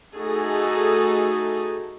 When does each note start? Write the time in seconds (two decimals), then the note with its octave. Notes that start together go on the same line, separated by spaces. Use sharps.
0.15 A3 D#4 F#4 G#4 A4